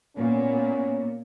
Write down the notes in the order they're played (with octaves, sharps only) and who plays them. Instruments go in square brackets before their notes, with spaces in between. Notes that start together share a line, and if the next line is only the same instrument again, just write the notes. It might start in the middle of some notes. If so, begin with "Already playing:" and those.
[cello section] A#2 [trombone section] B3 C#4